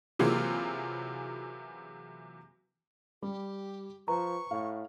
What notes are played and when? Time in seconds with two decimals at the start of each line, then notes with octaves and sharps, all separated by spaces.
0.19 C3 E3 F#3 A#3 F4 G#4
3.22 G3 G4
4.08 F3 B4 A#5 C#6
4.51 A2 F5